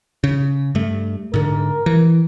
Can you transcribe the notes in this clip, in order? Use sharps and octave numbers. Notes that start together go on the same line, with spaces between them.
C#3
G2 A3
G#2 D3 A#4
E3